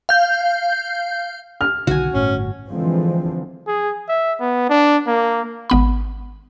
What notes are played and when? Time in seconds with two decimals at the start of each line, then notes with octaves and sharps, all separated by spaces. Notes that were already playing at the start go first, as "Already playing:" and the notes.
0.09 F5 G6
1.61 F6
1.87 B1 D3 D#3 F#4 G#5
2.14 G1 A2 C#4
2.69 D3 E3 F3 G#3 C4
3.67 G#4
4.09 E5
4.40 B3
4.69 D4
5.07 A#3
5.70 G#1 B3 B5